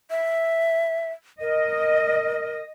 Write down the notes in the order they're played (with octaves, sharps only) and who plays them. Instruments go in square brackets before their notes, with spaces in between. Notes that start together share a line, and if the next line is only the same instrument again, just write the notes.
[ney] E5
[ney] A#4 [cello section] D#5